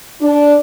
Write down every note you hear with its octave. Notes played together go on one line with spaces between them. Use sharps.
D4